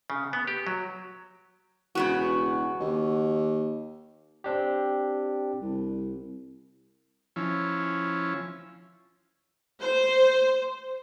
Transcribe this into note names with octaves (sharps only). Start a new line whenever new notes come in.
C#3
B3
G4
F#3
E1 C#3 B3 F#4
D#2
C4 D4 G4
C2
F3 C#4 E4
C5